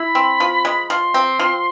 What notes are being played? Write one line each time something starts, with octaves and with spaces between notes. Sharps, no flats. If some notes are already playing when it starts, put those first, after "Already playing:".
Already playing: E4 B5
C4
F3
G#3
F3 C6
C4
F3